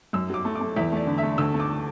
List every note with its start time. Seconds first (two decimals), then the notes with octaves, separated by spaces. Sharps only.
0.13 F#2 E6
0.30 F#3 D6
0.45 A3
0.55 D6
0.61 A3
0.76 E2 E5
0.92 A3 D5
1.07 D3
1.18 E5
1.23 A3
1.38 D2 E6
1.54 A3
1.60 D6